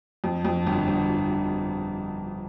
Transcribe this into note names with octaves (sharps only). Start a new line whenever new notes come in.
F2
F2
G1
G1